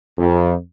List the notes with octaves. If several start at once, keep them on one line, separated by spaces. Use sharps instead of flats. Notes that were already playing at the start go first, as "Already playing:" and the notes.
F2